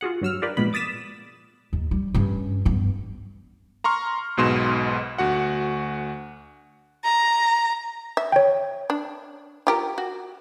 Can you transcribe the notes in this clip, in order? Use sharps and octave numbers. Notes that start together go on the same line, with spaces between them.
F4 F#4 G#4 F#5
G2 F#3 E6 F6
D4 F4 G4 A#4 B4 D5
F2 A#2 G#3 B3 B5
D6 D#6 A6 B6 E7
D#2
G3
G2 C#4
G2 B3
A#5 C6 C#6 F6
B1 G#2 B2 C6 E7
D2 F#4 F#5
A#5
E5
C#5 G5
D4
F4 G4 A#4
F#4